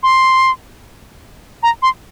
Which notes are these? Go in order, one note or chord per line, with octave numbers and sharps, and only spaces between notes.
C6
A#5
C6